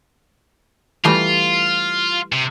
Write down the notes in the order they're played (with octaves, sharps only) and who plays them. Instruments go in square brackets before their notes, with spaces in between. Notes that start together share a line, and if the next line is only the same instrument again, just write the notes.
[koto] E3 G3 A3 [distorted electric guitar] F4
[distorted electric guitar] C3